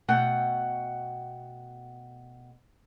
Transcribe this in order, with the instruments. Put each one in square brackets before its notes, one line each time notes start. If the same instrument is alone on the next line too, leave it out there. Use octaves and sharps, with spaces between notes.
[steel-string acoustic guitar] B2 A3 F#5 G5